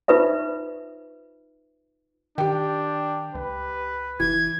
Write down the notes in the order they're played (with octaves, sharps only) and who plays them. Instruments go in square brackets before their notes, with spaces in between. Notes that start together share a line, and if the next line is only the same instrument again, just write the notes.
[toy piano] D#4 F4 B4 C5 E5
[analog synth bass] D#3 [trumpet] D4 [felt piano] G4 G5
[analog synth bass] C#2 [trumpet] B4
[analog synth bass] F#1 [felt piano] E3 [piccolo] G#6